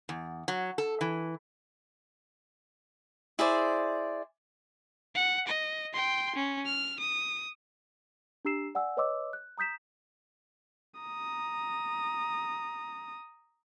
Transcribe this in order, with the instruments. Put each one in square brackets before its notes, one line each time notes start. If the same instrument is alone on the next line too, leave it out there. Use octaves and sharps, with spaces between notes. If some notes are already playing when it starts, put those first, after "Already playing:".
[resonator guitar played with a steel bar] E2
F#3
A4
E3
[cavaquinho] E4 G#4 C5 D5
[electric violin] F#5
D#5
G5 C6
C#4
F6
D#6
[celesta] D4 G4 A#5 E6 C7 E7
D5 F#5 G#5 E6
B4 C#5 D#5 C6 D6 E6
F#6
A#5 D#6 G6 B6 E7
[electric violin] A#5 D#6